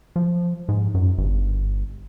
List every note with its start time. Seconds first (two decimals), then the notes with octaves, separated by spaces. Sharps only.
0.16 F3
0.69 G#2
0.94 F#2
1.18 G1